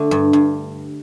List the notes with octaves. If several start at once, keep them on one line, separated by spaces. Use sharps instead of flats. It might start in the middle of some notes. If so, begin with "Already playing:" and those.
Already playing: D3 A3
G2
G2